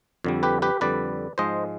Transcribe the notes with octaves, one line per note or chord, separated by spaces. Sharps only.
F2 D3 G3
G4 B4
G4 B4
F2 D3 G3 B4 D5
G#2 F3 G#3 C5 D#5